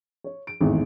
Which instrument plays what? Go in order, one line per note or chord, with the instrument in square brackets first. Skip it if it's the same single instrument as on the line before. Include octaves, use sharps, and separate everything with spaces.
[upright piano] C#5
D7
G#1 E2 A2